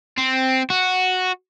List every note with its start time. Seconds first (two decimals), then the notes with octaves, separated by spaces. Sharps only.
0.18 C4
0.70 F#4